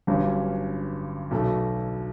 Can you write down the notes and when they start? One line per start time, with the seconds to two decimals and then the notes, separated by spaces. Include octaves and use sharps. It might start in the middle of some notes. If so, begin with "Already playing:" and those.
0.07 G1 G2 F#3 C#4
1.31 B1 B2 A3